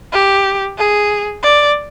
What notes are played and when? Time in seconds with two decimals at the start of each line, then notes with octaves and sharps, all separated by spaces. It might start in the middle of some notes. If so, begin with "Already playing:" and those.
0.13 G4
0.78 G#4
1.43 D5